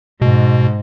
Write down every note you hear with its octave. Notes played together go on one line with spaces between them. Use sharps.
G#2 B2